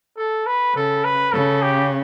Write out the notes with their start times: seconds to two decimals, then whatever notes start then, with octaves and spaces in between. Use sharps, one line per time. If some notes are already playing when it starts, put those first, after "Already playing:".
0.17 A4
0.46 B4
0.75 C#3 A4
1.04 B4
1.33 C#3 A4
1.62 G4